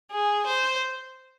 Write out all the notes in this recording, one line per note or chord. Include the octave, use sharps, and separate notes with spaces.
G#4
C5